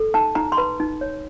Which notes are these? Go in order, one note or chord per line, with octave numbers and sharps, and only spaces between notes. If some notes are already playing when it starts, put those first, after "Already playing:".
Already playing: A4
D#4 A5
D#4 A#5
C6
B4 B5
D#4
C#5